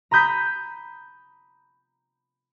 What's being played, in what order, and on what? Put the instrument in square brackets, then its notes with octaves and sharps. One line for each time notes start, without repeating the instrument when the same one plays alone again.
[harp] A#5 B5 D#6 G6 B6